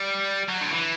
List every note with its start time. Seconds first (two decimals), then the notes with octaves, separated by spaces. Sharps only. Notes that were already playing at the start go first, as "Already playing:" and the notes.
Already playing: G3
0.49 F#3
0.61 D3
0.71 E3